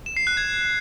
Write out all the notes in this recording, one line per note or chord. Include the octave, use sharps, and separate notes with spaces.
E7
C7
F#6
G#6